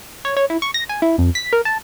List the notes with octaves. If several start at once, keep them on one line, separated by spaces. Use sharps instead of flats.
C#5
C#5
E4
C#6
A#6
G#5
E4
F2
B6
A#4
A5